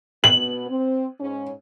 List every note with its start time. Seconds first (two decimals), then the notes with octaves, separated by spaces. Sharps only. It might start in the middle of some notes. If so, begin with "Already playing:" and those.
0.24 B2 B3 F#7
0.68 C4
1.20 G#2 C#4